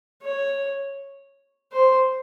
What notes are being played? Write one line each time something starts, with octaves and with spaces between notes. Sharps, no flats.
C#5
C5